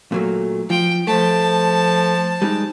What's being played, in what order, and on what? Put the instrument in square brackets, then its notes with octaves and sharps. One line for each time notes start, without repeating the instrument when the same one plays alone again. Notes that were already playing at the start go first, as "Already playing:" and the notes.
[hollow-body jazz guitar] A#2 F#3 A3
[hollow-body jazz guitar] F3 [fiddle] G5
[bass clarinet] F3 [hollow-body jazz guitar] A3 [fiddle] A5
[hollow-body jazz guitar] G3 G#3 D#4